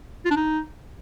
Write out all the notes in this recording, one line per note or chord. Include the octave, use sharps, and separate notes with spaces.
F4
D4
D#4